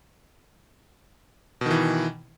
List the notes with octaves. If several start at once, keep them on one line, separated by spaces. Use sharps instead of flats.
B2 D#3 E3